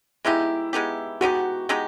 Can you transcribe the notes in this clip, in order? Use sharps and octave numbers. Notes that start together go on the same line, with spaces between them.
G#3 B3 D#4 E4 G4
G#3 B3 D#4 G4
G#3 B3 D#4 F#4 G4
G#3 B3 D#4 G4